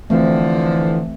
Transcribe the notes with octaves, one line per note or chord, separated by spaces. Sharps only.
D3 E3 F3 A3 C4